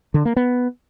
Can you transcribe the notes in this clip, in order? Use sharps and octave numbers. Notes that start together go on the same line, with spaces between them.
D3
A#3
B3